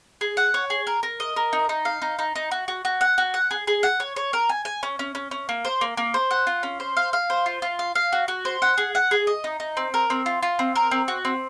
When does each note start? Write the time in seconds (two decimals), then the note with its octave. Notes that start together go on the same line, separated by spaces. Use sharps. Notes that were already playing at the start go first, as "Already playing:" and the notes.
0.21 G#4
0.37 F#5
0.54 C#5
0.70 G#4
0.87 A#4
1.03 A#4
1.20 D#5
1.36 A#4
1.53 D#4
1.69 D#4
1.85 F5
2.02 D#4
2.19 D#4
2.36 D#4
2.52 F#4
2.68 F#4
2.85 F#4
3.01 F#5
3.18 F#4
3.34 F#5
3.51 G#4
3.67 G#4
3.83 F#5
4.00 C#5
4.16 C#5
4.33 A#4
4.49 G#5
4.65 G#5
4.83 C#4
4.99 C#4
5.15 C#4
5.31 C#4
5.49 A#3
5.65 C5
5.81 A#3
5.97 A#3
6.14 C5
6.31 F#5
6.47 F4
6.63 C#4
6.80 C5
6.97 F5
7.13 F5
7.30 C5
7.46 F4
7.62 F4
7.79 F5
7.95 F5
8.12 F#4
8.28 F#4
8.45 C5
8.62 F#5
8.78 G#4
8.95 F#5
9.11 G#4
9.27 D#5
9.44 D#4
9.60 D#4
9.77 C4
9.94 A#4
10.10 C4
10.26 F4
10.43 F4
10.59 C4
10.76 A#4
10.91 C4
11.08 F#4
11.25 C4